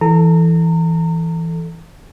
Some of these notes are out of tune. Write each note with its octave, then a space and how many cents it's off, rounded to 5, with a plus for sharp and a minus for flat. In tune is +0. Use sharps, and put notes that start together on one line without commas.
E3 +0 A4 +0 A#5 -30